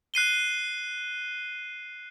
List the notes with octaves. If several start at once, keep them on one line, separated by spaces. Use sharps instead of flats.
F#6 C7 D#7 G7